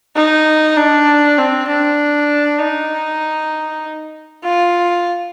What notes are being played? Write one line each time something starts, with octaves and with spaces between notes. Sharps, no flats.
D#4
D4
C4
D4
D#4
F4